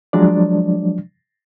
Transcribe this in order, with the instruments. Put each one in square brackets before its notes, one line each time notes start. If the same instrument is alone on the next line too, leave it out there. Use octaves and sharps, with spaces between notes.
[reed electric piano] F3 F#3 G#3 D4 D5